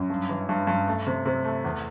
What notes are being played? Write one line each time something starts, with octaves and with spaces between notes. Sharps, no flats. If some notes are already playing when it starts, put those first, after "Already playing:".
Already playing: F#2
G2
E3
G2
G2
A3
C3
C3
A3
E2